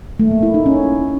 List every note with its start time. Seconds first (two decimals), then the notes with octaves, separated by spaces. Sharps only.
0.20 A3
0.31 A#3
0.43 E4
0.54 D#4
0.66 C#4